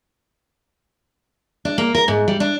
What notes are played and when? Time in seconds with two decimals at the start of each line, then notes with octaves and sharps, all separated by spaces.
1.65 D4
1.78 A#3
1.95 A#4
2.08 G#2
2.28 G3
2.40 D4